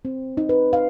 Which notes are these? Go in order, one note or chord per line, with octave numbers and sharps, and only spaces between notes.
C4
D#4
B4
F5